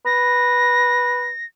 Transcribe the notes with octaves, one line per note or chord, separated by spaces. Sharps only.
B4 A#6